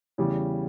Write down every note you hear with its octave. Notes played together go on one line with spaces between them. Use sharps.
E2 C#3 E3 G3